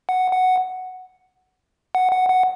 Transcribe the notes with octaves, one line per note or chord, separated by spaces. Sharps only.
F#5
F#5
F#5
F#5
F#5